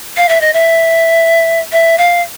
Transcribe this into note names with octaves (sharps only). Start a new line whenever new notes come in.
F5
E5
D#5
E5
E5
F5